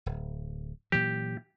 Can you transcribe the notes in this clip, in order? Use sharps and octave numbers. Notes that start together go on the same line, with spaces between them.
D1
A#2 E3 F#3 G4